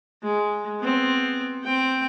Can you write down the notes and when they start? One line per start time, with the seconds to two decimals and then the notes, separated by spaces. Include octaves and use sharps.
0.23 G#3
0.81 B3 C4
1.64 C4 G5